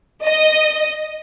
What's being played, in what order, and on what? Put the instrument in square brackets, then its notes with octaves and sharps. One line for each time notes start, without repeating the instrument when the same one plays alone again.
[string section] D#5